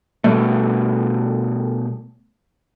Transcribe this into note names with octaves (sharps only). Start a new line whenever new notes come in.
B2 G3 A3